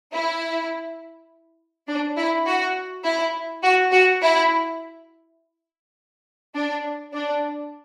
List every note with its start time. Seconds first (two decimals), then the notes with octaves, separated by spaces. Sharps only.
0.12 E4
1.87 D4
2.17 E4
2.46 F#4
3.04 E4
3.63 F#4
3.92 F#4
4.21 E4
6.55 D4
7.13 D4